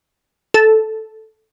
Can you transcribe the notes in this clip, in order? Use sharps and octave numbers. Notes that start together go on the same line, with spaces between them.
A4